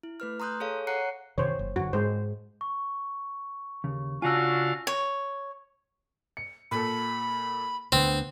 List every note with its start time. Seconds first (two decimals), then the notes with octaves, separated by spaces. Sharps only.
0.03 E4
0.20 A3 B4 F6
0.40 A#5 C6 D#6 F#6 G6
0.60 G#4 A4 C#5 F5
0.87 C#5 F#5 A#5 F#6 C7 C#7
1.38 F#2 C3 D#3 C5 C#5
1.59 F#1
1.76 F#2 D3 F#4
1.93 G#2 G#3 C5
2.61 C#6
3.84 D#2 C#3
4.22 C#3 D4 F4 F#4 F5 G#5 E6
4.87 C#5
6.37 C#7
6.71 A#2 A4 B5
7.92 D2 D3 B3 C4 D4